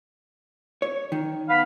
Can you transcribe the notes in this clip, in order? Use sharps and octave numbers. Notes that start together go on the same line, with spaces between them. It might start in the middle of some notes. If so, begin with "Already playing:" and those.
C#5
D#3
B3 F5 B5